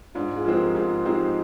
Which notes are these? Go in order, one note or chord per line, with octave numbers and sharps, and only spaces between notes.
G#2 D4 F4
F4 G#4
F3 G#3 C4
G4 A#4
G#2 F4 G#4
F3 G#3 C4 D#4 G4